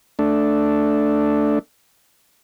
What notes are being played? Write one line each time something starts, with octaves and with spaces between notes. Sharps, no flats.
A3 D4